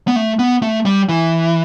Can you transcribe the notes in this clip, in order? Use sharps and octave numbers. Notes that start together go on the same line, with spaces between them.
B3
A3
B3
A3
G3
E3